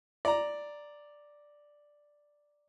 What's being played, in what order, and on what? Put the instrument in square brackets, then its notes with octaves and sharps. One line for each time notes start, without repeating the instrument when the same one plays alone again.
[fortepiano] D5 A#5